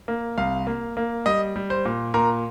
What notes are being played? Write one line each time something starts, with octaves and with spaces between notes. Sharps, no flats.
A#3
C2 F5
A#3
A#3
G3 D#5
G3
C5
A#2
A#2 A#4